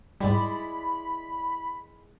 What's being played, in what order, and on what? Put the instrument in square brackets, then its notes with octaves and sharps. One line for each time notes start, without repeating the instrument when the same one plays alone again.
[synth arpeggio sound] G#2 G3 [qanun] G#3 E4 D5 [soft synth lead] B5